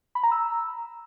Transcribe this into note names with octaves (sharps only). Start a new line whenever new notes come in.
B5
A#5
E6